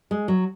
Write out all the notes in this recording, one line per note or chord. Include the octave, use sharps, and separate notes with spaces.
G#3
F#3